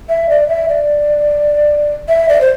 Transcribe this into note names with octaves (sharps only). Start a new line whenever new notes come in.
E5
D5
E5
D5
E5
D5
C5